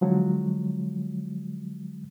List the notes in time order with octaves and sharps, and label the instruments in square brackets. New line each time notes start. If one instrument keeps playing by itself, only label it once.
[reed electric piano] D3 F3 F#3 G#3